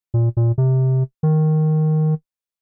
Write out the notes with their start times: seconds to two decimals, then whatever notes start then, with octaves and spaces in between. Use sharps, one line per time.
0.14 A#2
0.37 A#2
0.58 C3
1.23 D#3